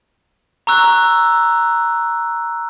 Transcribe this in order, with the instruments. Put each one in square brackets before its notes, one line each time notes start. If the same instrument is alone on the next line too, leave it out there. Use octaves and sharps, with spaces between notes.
[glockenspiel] A#5 C#6 E6 F#6